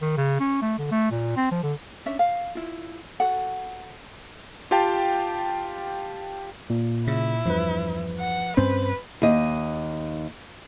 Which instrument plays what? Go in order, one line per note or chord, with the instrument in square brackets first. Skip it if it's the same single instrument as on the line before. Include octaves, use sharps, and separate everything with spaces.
[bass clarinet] D#3
C#3
C#4
A3
D3
A3
A#2
C4
F3
D3
[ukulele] C#4 D4 E5
F5
E4 F4
F#4 A4 F#5
[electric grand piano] F4 G4 F5 G5 A5
[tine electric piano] A#2
[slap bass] C#3 [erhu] E4
[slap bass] E2 G2 [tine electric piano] F3 B4
[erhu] F#5
[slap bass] G2 C4 C#4 [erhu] B4 [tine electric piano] C5
[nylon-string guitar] D#2 D#5